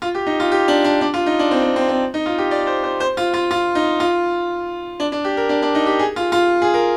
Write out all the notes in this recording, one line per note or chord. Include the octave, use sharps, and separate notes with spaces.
F4
G4
D#4
F4
G4
D4
D4
D4
F4
D#4
D4
C4
C4
C4
C4
D#4
F4
G4
D5
C5
C5
C5
F4
F4
F4
D#4
F4
D4
D4
G4
A#4
D4
D4
D#4
G4
G#4
F4
F4
G#4
A#4